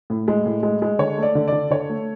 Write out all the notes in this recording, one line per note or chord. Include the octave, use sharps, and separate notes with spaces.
A2
G#3
A2
G#3
G#3
D3 C#5
A3 D5
D3
D3 D5
D3 C#5
A3